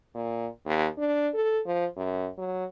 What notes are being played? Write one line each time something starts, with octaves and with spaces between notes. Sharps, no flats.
A#2
D#2
D4
A4
F3
F#2
F#3